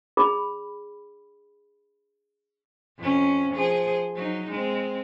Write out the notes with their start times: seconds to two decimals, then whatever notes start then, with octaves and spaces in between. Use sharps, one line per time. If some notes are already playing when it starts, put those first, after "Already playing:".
0.17 G#4 B5
2.99 F2 C#4
3.55 F3 G#4 C5
4.15 F#3 D#4
4.50 G#3 C4